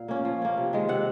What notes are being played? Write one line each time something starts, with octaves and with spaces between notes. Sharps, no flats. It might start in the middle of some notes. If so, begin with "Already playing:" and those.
Already playing: A#2 F5
A#3 C#4
F3
A#3 C#4
C3
D#3 G#3
C3 F#5